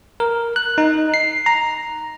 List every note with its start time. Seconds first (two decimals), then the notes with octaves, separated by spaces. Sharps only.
0.20 A#4
0.56 F#6
0.78 D#4
1.14 C7
1.46 A#5